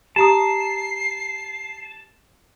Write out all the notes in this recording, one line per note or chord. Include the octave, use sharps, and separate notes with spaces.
G4 A5 A#5 D#6 C7